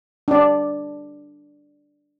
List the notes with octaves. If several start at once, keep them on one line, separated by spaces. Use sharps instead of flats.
D4 D5